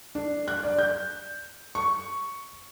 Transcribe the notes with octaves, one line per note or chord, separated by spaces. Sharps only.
D4
F#6
D5
G6
C#6